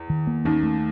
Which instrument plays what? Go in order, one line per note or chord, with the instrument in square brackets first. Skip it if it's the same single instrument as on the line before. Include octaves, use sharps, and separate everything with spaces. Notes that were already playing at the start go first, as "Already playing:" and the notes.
Already playing: [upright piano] E2
[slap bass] D#3
A#3
[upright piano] D#2 D#3 [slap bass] C#4
[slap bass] A3